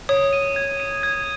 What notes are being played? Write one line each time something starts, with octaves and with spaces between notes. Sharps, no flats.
C#5 D#6
D#7
G#6
D#7
G#6